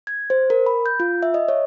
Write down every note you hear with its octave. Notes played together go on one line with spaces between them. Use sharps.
G#6
C5
A#4
B5
G6
F4
E5
D#5
C#5